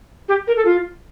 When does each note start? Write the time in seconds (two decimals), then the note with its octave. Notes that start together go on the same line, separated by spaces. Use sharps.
0.29 G4
0.47 A#4
0.57 A4
0.65 F4